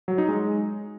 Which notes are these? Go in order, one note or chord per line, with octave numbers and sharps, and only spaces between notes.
F#3
D#4
G#3